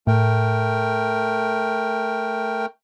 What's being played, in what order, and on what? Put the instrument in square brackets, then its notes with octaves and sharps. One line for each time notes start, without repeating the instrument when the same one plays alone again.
[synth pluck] A2 [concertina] A3 A#4 G5